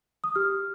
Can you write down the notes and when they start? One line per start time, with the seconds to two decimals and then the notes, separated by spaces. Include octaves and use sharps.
0.24 D#6
0.35 G4 F6